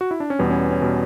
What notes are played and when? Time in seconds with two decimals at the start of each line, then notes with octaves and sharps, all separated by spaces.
0.01 F#4
0.11 E4
0.20 D4
0.30 C#4
0.39 E2 B2 G3 B3
0.50 C#4
0.71 C#4
0.82 B2 G3